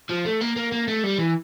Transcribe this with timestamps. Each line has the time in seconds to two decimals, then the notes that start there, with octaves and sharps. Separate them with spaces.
0.09 F3
0.25 A3
0.41 A#3
0.56 A#3
0.72 A#3
0.88 A3
1.03 G3
1.19 E3